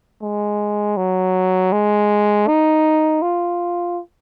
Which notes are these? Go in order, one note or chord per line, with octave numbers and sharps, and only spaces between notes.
G#3
F#3
G#3
D#4
F4